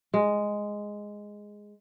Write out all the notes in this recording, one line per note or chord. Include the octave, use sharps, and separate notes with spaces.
G#3